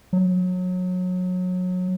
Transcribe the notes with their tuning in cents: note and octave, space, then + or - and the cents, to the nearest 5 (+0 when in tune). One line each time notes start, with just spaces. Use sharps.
F#3 -25